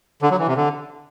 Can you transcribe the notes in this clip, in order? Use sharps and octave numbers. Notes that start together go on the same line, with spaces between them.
D3
F#3
E3
C3
D3